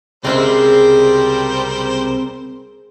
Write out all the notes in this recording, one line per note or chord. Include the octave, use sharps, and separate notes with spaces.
C2 C#3 G3 G#3 C4 A#4 C5 E5